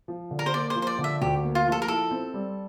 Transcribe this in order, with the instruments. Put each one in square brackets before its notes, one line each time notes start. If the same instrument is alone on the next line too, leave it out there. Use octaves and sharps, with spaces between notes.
[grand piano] F3
D3
[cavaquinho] A#4
C5
[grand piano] A#3 [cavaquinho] D5
[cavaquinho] C5
[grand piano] F3
[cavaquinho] C5
D5
[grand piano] D3
[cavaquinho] E5
[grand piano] D2 [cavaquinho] G4
[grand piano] A#3
[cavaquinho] F4
[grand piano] F3
[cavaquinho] A4
A#4
[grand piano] E4 [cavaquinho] A4
[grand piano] C4
G3